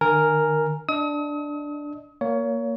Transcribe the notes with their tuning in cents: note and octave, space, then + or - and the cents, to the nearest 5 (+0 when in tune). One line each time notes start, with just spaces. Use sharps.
D#3 -45 A#4 +0 G#5 +0
D4 +0 D#5 +0 D#6 +40
A#3 +0 C#5 +25